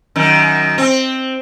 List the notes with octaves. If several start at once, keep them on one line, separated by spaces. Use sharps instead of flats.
F#2 D#3
C4